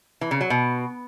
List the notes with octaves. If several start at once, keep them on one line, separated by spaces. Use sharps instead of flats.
E3
C#3
F#3
B2